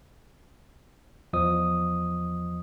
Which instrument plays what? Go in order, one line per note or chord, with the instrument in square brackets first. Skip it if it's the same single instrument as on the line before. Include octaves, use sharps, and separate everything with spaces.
[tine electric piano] E2 F3 D#5 D#6